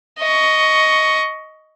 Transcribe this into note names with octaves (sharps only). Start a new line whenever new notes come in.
D#5 C#6